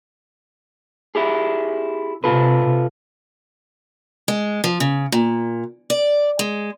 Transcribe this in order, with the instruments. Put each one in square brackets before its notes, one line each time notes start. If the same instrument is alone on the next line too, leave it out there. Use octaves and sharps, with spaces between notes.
[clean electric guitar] E4 G4 G#4
[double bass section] C3 [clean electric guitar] F4 A4 B4
[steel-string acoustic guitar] G#3
F3
C#3
A#2
D5
G#3